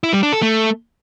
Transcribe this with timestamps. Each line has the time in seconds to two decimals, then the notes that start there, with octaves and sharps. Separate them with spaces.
0.03 E4
0.13 G3
0.23 D4
0.33 A4
0.42 A3